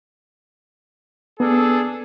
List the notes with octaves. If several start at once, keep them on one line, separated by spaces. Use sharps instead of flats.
B3 D4 G#4 A4